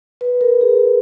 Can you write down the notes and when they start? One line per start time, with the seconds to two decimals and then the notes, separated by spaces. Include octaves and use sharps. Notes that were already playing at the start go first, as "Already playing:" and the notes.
0.21 B4
0.41 A#4
0.61 G#4